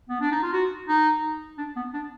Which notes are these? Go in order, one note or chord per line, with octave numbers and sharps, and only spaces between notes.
B3
D4
D#4
F4
F#4
D#4
D4
B3
D4